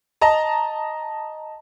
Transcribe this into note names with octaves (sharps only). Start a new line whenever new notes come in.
D#5 A5 A#5